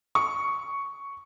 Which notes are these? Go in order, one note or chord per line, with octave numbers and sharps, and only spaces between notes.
C#6